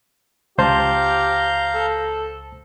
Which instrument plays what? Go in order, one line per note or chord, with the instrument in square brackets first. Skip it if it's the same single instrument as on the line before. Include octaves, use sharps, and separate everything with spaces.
[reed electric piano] C#2 C5 A5 [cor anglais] G4 [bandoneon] F5 A#5 G6
[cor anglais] A4